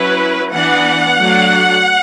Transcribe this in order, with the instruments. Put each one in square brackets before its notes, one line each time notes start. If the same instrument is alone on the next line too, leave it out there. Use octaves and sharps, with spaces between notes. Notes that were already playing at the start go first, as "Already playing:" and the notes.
Already playing: [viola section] F#3 C#4 E4 B4
E3 B3 D4 F#5
F#3 A3 D4